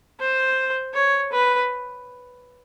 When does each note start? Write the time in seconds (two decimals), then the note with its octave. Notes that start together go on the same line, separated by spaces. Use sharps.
0.20 C5
0.94 C#5
1.32 B4